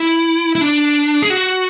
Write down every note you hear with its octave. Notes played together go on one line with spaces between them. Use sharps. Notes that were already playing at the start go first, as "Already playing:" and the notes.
Already playing: E4
E4
D4
G#4
F#4